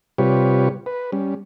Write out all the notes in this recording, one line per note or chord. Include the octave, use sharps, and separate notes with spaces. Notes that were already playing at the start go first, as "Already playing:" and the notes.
C3 G3 F4 G4 B4 C#5
B4
G3 C#4